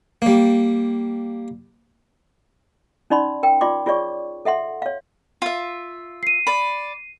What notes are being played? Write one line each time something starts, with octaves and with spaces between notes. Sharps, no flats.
G3 A#3
C#4 D#4 D5 B5 C6
A#4 G5
F4 D5 C6 D6
F4 G#4 C#5 D5 C#6
A4 E5 F#5 C6
C#5 F5
F4 E5
C7 D#7
D5 B5